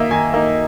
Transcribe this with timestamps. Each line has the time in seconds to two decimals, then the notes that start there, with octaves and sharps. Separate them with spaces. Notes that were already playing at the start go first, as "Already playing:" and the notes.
Already playing: D#3 A#3 D#4 D#5 E5
0.11 D#3 G#5
0.34 A#3 D#4